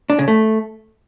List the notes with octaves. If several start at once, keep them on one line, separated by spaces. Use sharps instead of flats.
D4
C#3
A3